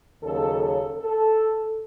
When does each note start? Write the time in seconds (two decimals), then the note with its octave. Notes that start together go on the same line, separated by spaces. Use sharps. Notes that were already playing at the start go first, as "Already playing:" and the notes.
0.22 D#2 C#3 F#3 A4
0.60 A4
0.99 A4